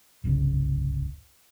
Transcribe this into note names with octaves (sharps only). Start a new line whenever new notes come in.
D1 G1 C2 C#3